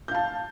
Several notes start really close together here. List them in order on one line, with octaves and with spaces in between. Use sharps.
G6 F5 A5